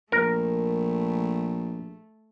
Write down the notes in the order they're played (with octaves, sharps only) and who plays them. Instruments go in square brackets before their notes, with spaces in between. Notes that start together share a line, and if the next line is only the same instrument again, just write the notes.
[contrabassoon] A#1 [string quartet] A3 [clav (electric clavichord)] A#4